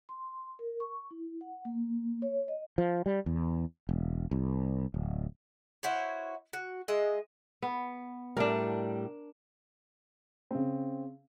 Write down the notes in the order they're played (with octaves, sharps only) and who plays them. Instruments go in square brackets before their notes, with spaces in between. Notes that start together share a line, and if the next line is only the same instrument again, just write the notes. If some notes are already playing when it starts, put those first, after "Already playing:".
[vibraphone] C6
A#4
C#6
E4
F#5
A#3
C#5
D#5
[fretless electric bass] F3
G3
E2
E1
C2
D1
[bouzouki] E4 F#4 C5 C#5
F#4
G#3 D#5 E5
[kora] B3
[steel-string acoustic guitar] A2 G3 [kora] D4 A#4
[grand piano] C#3 C4